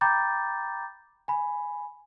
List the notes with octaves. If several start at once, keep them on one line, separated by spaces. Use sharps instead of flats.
G5 A#5 B5 D6 G6 A6
G#5 B5